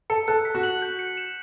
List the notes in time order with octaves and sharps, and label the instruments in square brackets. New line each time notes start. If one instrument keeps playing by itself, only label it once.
[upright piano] A4 [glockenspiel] C#7
[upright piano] A4 [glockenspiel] F#6
[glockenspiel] B6
[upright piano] F#4
[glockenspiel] F#7
G6
C#7
E7